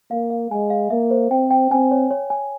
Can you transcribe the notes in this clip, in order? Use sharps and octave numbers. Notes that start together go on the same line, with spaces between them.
A#3 F5
F5
G#3 G#5
F5
A#3 E5
C5
C4 G5
G5
C4 G#5
C#5
C#5
G#5